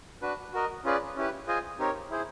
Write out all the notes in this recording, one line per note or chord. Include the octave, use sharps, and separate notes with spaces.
D4 F#4 B4
F#4 A#4 D#5
C#4 F4 G#4 B4 D5
C#4 E4 G4 B4
F4 G#4 C5 D#5 G#5
C4 D#4 G4 A#4 C#5
E4 G#4 C5